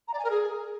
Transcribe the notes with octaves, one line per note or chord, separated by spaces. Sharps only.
A#5
D5
G#5
A#4
G#4